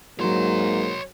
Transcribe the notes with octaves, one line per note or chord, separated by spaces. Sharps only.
G#2 F#3 A#3 C#5 C6